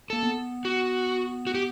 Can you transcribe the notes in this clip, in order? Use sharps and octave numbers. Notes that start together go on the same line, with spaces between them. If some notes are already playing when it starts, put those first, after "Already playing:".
A#3 A4
B3
F#4
F#4
G4